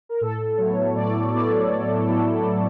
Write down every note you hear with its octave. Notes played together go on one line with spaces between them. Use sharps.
A#4
A2 A4
F#3 B3 E4 C#5
A2 D5
F#3 B3 E4 D5
A2
F#3 B3 E4
A2